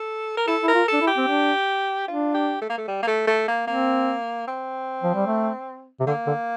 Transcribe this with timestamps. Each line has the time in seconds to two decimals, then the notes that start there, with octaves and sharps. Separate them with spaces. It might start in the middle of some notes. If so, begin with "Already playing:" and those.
Already playing: A4
0.37 A#4
0.47 E4 A4
0.63 E4
0.68 A#4
0.74 F4
0.88 D4 A4
1.01 E4
1.07 G4
1.17 C4
1.28 D4
2.08 D4 F4
2.34 G4
2.61 A3
2.70 A#3
2.78 A3
2.87 G3
3.03 A#3
3.07 A3
3.27 A3
3.48 A#3
3.67 A#3 C4
4.47 C4
5.03 F3
5.15 G3
5.27 A3
6.00 C3
6.07 D3 A#3
6.27 D3